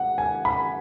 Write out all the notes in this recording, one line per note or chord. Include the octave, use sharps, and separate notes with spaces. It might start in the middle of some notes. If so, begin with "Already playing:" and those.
Already playing: F#5
G#5
B5